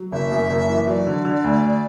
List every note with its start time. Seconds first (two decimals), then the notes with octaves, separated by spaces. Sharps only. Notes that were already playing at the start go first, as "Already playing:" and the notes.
Already playing: F#3
0.12 F#1 E5
0.32 F#2
0.50 F#1
0.69 E3
0.87 F#3 D5
1.07 D3
1.25 D3
1.44 D2